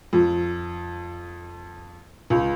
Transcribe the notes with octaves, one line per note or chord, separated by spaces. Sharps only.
F2
C#2